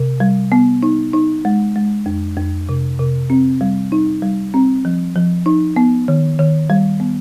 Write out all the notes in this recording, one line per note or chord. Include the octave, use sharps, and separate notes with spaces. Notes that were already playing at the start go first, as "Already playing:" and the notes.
Already playing: C3
G3
B3
D#4
D#4
G#3
G#3
F2
F2
C3
C3
C4
G3
D#4
G3
C4
F3
F3
D#4
B3
D#3
D#3
G3
B3